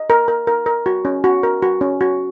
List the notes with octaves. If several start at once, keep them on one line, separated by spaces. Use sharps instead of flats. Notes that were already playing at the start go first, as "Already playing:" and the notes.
Already playing: D#5
A#4
A#4
A#4
A#4
F#4
C#4
F#4
A#4
F#4
C#4
F#4